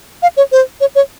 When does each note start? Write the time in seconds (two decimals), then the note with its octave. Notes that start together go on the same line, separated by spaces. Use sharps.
0.22 F5
0.37 C#5
0.52 C5
0.81 C#5
0.95 C#5